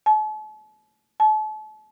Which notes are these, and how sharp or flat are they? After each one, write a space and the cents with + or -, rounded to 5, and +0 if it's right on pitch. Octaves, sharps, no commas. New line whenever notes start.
A5 -45
A5 -40